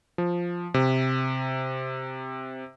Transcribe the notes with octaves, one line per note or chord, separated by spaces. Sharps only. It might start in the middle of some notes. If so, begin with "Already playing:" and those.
F3
C3